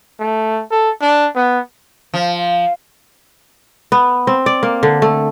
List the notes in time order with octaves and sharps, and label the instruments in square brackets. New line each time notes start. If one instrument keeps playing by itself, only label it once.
[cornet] A3
A4
D4
B3
[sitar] F3
[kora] B3
C4
D5
A#3
D3
A3